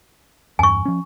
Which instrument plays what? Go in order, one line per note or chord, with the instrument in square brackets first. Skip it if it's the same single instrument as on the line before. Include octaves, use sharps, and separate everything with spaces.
[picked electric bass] E2 G2 [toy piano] G#5 C#6
[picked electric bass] F3 C#4